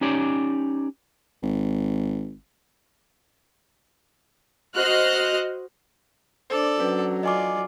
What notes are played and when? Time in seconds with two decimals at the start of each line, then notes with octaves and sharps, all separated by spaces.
0.01 C#4 D#4 G4 C#5 D5
1.43 G#1
4.74 F#4 C5 D#5 F6 F#6
6.50 D4 A4 C5 D5
6.80 F#3 C#4 B4
7.23 F4 D5 D#5 G#5 D6